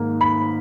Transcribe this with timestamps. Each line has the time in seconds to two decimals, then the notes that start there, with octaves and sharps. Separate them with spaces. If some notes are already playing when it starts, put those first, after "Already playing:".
Already playing: G#2 D#3 A#3
0.21 B5